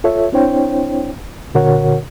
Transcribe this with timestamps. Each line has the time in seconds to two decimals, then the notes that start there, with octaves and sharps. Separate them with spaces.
0.04 F4 A4 C#5 E5
0.32 C4 D4 E4 C5 C#5 G5
1.54 A#2 D3 F#4 A#4 C#5 F#5